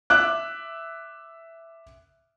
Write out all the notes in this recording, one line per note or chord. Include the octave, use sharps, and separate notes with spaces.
E5 D6 F#6